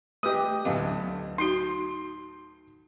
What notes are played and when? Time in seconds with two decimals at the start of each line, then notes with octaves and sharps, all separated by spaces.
0.23 A3 G4 B4 D#5 D#6
0.65 D2 A2 F#3 B3 D#5 F5
1.38 D#4 F#4 C6